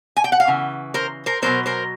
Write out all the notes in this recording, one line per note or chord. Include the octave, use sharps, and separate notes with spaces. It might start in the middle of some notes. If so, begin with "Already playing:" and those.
G#5
G5
F#5
F5
C#3 E3
A#4 C5
A#4 C5
B2 F#3 A3 A#4 C5
A#4 C5